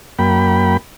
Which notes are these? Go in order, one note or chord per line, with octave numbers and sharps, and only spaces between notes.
F#2 A#3 G5 B5